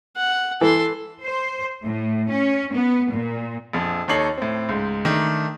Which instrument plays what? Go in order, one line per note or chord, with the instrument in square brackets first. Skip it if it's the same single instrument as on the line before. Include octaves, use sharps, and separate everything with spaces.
[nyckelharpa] F#5
[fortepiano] E3 [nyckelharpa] A4 C6
[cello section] C5
A2
C#4
B3
A#2
[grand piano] A#1 F2
D#2 D#4 A4 C#5 C7 F#7
A2 C4
C#2 G#2
D#3 A3 D4